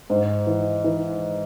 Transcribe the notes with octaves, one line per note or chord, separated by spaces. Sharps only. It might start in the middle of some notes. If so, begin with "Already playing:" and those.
G#2
E3
E3